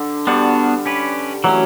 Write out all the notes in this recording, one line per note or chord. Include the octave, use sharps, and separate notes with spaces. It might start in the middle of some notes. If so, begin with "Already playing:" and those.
Already playing: D3
G3 B3 D4 F#4
C#4 G4 B4
E3 F#3 A3 C#4